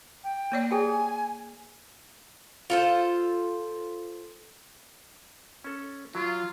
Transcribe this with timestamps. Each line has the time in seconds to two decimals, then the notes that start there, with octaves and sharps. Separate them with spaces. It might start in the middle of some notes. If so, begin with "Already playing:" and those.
0.24 G5
0.52 A#3 C#5 D5
0.71 G#4 A4 G5 G#5
2.70 F4 A4 C5
5.64 C#4 A4
6.15 F#3 F4